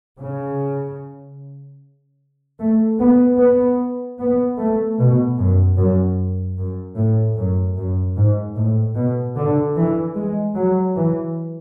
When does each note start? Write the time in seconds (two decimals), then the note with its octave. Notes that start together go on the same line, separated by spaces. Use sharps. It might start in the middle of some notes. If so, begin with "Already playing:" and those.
0.20 C#3
2.60 A3
2.99 B3
3.38 B3
4.19 B3
4.59 A3
4.99 B2
5.38 F#2
5.77 F#2
6.58 F#2
6.97 A2
7.37 F#2
7.77 F#2
8.17 G#2
8.56 A2
8.96 B2
9.36 D3
9.76 E3
10.15 G#3
10.56 F#3
10.96 E3